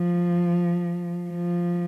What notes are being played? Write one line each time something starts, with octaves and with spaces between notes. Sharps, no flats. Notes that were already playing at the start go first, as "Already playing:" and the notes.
Already playing: F3
F3